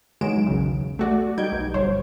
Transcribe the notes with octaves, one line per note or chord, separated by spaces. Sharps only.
E2 D#3 F#3 G#3 D7 E7
B1 C#3
A3 F#4 D5
G3 D#4 G6 G#6 D7
B1
G1 C5 C#5